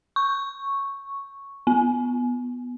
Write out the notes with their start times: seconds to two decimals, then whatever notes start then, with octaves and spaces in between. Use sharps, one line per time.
0.16 C#6
1.67 B3